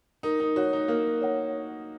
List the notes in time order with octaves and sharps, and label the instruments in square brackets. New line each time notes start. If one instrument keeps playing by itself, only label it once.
[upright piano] D#4 [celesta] A#4
[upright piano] D#4
[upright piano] F#4 [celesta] C#5 F#5
[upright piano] D#4
[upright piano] A#3 [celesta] A#4
[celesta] C#5 F#5